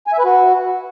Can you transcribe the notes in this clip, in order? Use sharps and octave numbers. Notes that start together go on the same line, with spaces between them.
G#5
E5
B4
F#4